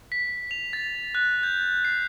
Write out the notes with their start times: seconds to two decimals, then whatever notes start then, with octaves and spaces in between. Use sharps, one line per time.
0.12 B6
0.51 F7
0.73 A6
1.15 F#6
1.43 G6
1.85 C7